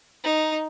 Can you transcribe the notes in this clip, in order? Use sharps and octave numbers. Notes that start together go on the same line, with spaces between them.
D#4